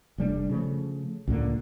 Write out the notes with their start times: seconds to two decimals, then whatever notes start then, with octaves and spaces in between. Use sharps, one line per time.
0.18 F1 G3 A3 D4
0.50 C#3 F3 A3
1.27 C#2 A2 D3 A#3